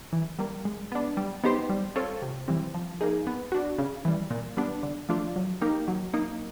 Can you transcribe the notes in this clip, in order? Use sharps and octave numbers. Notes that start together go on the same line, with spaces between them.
E3
G3 A#3
G#3
B3 D4
G3
B3 D#4 G4 C5
G3
C4 F4 A4 C#5
C3
E3 G3 C4
F3
A#3 D#4 G#4
B3
D4 F#4
C#3
E3 G3
A#2
G3 B3 D4
D3
F3 A3 D4 F4
F#3
A#3 D#4 G4 A#4
F#3
A#3 D#4